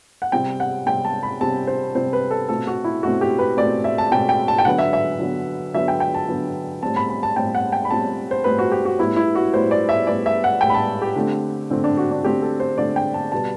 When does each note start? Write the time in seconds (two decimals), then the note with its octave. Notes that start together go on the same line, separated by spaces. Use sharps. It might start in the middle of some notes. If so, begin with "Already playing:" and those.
0.22 F#5
0.32 C3 G3 C4 G5
0.60 F#5
0.86 C3 G3 C4 G5
1.05 A5
1.23 B5
1.41 C3 G3 C4 A5
1.67 C5
1.95 C3 G3 C4 C5
2.13 B4
2.31 A4
2.49 B2 A3 C4 A4
2.67 F#4
2.84 E4
3.03 B2 A3 C4 F#4
3.21 G4
3.39 B4
3.57 B2 A3 C4 D5
3.84 E5
3.98 A5
4.11 B2 A3 C4 G5
4.29 G5
4.48 A5
4.58 G5
4.65 D3 F#3 B3 F#5
4.79 E5
4.93 E5
5.19 D3 F#3 B3
5.74 D3 F#3 B3 E5
5.88 G5
6.00 G5
6.14 A5
6.29 D3 F#3 B3
6.83 A2 G3 C4 A5
6.96 B5
7.09 B5
7.23 A5
7.36 A2 G3 C4 G5
7.55 F#5
7.72 G5
7.85 B5
7.91 A2 G3 C4 A5
8.31 C5
8.44 A2 G3 C4 B4
8.59 F#4
8.72 G4
8.85 F#4
8.99 A2 G3 B3 E4
9.16 E4
9.35 F#4
9.53 A2 G3 B3 C5
9.71 D5
9.89 E5
10.07 A2 G3 B3 D5
10.26 E5
10.44 F#5
10.61 A2 G3 B3 G5
10.70 B5
10.74 A5
11.02 G4
11.16 D3 A3 C4
11.70 D3 A3 C4
11.84 D4
11.97 F#4
12.11 D4
12.23 D3 A3 C4 G4
12.42 A4
12.60 C5
12.78 D3 A3 C4 D5
12.96 G5
13.14 A5
13.32 B2 G3 B3 A5